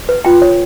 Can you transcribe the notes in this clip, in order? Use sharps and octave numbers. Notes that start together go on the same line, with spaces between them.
B4
F4 G5
C#5